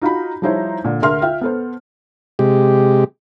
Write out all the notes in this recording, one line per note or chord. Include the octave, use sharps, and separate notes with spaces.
D#4 F4 F#4 B5
F3 G3 D#4 E4 C5 C#5
A#2 D3
D2 D3 A#4 E5 C6 F6
F4 E5 G5
B3 A4 C5
C3 G#3 G4